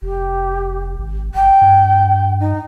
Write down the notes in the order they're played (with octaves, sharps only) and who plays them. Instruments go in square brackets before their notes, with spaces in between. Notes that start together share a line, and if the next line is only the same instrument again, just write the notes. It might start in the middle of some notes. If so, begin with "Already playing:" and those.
[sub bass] F1 [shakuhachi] G4
[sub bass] G#1
[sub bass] G1 [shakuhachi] G5
[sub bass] G2
[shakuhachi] D#4